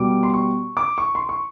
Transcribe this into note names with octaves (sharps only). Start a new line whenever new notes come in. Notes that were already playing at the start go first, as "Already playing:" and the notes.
Already playing: B2 G3 D6
C6
C#6
D6
C#6
C6
C#6